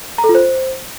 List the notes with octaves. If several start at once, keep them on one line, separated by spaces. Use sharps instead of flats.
A#5
A4
F4
C5